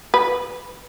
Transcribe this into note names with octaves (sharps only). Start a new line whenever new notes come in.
B4